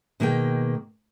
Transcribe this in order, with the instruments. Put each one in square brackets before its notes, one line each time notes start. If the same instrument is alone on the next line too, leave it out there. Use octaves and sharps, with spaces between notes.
[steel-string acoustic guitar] B2 D#3 A#3 G#4 G5